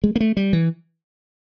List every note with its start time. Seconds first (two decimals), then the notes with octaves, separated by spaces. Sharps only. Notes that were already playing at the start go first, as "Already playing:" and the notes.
0.04 G#3
0.16 A#3
0.20 A3
0.37 G3
0.53 E3